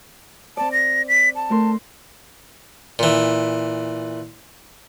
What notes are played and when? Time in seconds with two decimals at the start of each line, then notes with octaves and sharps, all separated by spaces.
0.57 C4 D5 A5
0.72 A#6
1.08 B6
1.36 A5
1.50 A3 A#4 C6
2.99 A#2 E3